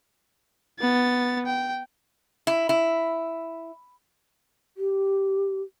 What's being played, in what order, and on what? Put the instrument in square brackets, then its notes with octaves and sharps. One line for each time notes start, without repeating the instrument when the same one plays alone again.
[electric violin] B3 A6
G5
[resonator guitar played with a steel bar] E4
E4
[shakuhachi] G4